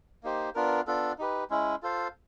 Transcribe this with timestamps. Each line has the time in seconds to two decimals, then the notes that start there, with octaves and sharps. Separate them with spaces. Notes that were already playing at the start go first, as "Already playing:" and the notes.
0.23 A#3 D#4 G4 C5
0.55 B3 D4 F4 A#4
0.87 B3 D4 F4 A4
1.18 D#4 G4 B4
1.50 G#3 C#4 E4
1.83 F4 A4 C5 F5